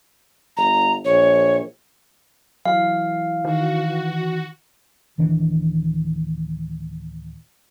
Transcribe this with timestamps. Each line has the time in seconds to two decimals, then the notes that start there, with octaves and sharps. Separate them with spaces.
0.57 G1 A#5
1.05 A#1 C#5
2.65 E3 F#3 F5
3.45 D#3 F#4
5.18 D1 D#3 E3 D4